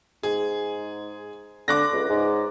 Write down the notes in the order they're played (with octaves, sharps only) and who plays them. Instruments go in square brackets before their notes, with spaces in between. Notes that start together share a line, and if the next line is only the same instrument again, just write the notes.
[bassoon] G#2 [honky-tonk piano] G#4
[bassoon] D3 [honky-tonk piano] D6 F#6 A#6
[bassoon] C#2
G#2